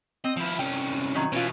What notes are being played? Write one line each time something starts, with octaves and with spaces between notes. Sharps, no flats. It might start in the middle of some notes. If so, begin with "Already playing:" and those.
C4 D#5
F3 E4
C2 C#4 G5
D#3 F#3
B2 E3 C#4 F4